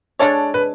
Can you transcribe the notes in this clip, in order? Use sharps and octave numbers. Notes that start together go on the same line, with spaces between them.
G#3 D4 A4 C#5 D5
B4